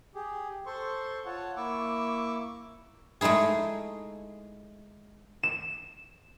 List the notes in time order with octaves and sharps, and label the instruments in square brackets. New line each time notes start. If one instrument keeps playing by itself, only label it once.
[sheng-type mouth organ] G4 G#4
A4 C5 C6 C#6
F4 C#5 F#5 A5
A#3 E4 C#6 D6 E6
[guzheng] G#3 A3 D#4 E4 G#4
[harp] E7